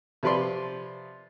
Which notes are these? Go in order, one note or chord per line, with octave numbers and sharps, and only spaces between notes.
C3 F3 B4 D5 C6